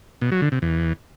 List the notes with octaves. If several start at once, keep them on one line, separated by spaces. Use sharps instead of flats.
B2
F#3
D3
C3
E2